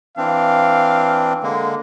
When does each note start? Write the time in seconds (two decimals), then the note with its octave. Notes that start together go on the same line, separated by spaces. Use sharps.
0.17 E3 C4 D4 F5
1.43 D3 G#3 A#3